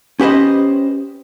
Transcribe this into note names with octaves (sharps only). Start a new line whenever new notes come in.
C#4 G4 B4 C5 D#5